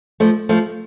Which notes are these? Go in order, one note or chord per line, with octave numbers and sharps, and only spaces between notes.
F3 A3
F3 A3